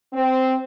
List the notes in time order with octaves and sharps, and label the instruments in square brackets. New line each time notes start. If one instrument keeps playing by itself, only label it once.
[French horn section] C4